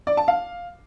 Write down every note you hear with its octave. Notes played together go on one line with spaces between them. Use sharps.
D5
A5
F5